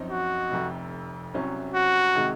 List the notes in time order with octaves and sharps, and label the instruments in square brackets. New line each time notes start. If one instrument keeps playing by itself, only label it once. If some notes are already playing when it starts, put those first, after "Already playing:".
Already playing: [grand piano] F#2 F3 C4 D#4
[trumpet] F#4
[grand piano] F1 F2 C3
C2 C3 F#3 C#4
[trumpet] F#4
[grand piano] C3 D#3 G#3